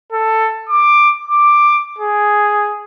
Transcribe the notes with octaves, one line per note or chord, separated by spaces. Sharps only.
A4
D6
D6
G#4